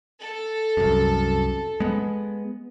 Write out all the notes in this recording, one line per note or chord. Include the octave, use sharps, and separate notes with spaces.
A4
C2 F#2
G#3 B3